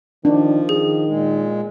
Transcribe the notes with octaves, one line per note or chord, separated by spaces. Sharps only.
D#3 F3 D4
D#3 G#4
A#2 G#3